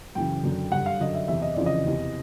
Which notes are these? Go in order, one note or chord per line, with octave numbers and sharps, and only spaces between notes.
F#2 C#3 E3 G5
F#2 D3
G2 D3 F#5
F5
F#2 D3 D#5
E5
E2 C3 E3 E5
D#5
F2 C#3 E3 D5
D#5
E2 C3 E3